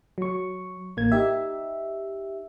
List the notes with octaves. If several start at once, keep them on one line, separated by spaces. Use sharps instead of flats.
F#3 C#6
A1 A#3 G#6
D#4 G4 E5